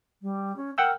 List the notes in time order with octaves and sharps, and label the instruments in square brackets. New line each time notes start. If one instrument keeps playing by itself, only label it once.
[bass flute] G3
C#4
[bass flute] A#4 [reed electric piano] F#5 G5 E6